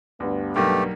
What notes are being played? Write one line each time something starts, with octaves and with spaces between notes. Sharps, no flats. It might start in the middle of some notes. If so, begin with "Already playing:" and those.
D2 G2 B3
B1 G3 A3 A#3 G4